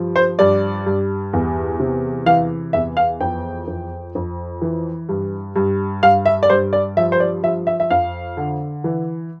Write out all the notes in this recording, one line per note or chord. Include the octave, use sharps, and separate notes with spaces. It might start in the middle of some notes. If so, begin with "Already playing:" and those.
Already playing: G2 F3
C5
G2 D5
G2
E2
C3
E3 F5
E2 E5
F5
F2 G5
F2
F2
E3
G2
G2
G2 F5
E5
D5
G2 C5
D5
F3 E5
C5
D5
F3 E5
E5
E5
F2 F5
D3
E3